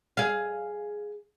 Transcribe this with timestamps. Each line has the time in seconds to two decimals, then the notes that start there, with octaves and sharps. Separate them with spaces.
0.17 G#4 F5